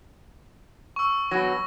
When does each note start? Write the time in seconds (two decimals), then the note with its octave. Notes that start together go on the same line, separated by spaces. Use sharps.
0.96 C#6 E6
1.31 B2 F#3 A#6